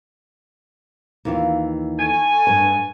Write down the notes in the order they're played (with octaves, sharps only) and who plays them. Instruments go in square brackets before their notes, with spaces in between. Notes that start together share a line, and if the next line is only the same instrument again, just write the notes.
[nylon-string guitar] D#2 E3 F4
[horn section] A3 G#5
[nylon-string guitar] G2 B4